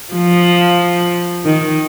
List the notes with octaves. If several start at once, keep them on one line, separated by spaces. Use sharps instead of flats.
F3
D#3